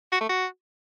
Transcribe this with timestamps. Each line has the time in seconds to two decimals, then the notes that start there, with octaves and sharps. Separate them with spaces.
0.12 F#4
0.21 A3
0.29 F#4